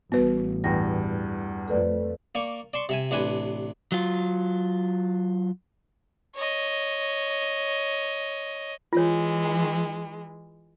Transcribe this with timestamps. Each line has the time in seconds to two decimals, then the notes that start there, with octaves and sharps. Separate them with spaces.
0.12 A1 G3 B3 F#4 B4
0.64 E2 G2 G5 A#6
1.68 F2 A3 A4 B4 D5
2.35 A#3 D5 C#6
2.74 D5 A5 C6 C#6
2.89 C3 E5 G#5
3.11 A1 C3 D4 B4 G#5
3.92 F#3 F4
6.35 C#5 D#5
8.93 E3 G#3 F4 C#5